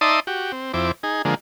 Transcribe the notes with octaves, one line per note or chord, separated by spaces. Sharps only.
D#4 D5 E5 A5 C6 D#6
F#4 G4
C4
F2 C4 E4 D6
D#4 G#4
D3 F3 G#3 A#3